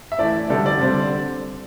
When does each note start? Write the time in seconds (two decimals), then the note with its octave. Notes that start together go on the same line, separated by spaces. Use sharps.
0.12 E5
0.18 E3 A3 E4 D5
0.50 D3 G3 D4 A4
0.66 D5
0.81 D3 G3 C4